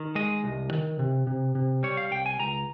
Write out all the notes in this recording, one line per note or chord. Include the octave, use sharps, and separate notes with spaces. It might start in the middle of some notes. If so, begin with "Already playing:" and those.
Already playing: D#3
G#3 D#5
C2
D#3
C3
C3
C3
G3 C#5
F5
C2 G5
G#5
C#2 A#5